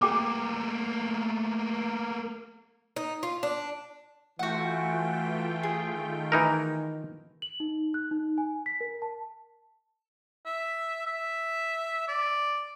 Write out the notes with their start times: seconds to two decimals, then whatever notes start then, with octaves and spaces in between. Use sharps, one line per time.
0.02 A3 A#3 G#4 G5 D6
2.96 D#4
3.23 F4
3.43 D4
4.39 E3 A3 F4 F#4 F#5 G5
5.63 G#4
5.94 D#3
6.32 E3 D#4 A#4
7.42 F#7
7.60 D#4
7.94 F#6
8.11 D#4
8.38 G#5
8.66 B6
8.81 A#4
9.02 A5
10.46 E5
11.07 E5
12.08 D5